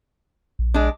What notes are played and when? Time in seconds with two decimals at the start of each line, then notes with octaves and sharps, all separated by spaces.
0.59 A#1
0.74 G#3 D4